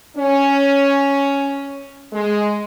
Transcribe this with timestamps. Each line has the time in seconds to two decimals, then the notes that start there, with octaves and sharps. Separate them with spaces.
0.17 C#4
2.13 G#3